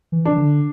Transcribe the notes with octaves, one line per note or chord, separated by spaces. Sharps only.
E3
D4
E3
D3